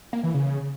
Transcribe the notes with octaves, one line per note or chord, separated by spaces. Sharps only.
A#3
E3
C#3